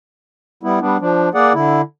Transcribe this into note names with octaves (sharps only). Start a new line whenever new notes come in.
G3 B3 E4
G3 B3 D4
F3 D4
A#3 G#4 D5 F#5
D3 E4